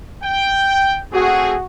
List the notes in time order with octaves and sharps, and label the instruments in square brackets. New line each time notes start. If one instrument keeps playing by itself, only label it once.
[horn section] G5
[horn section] A3 C4 G#4 [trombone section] F#4